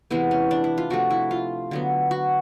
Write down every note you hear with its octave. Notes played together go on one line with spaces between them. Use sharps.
C3 E3 G#3 B3 E4
C#4
D4
E4
F4
C3 F3 A3 F#4
E4
F4
D3 F#3 B3
F#4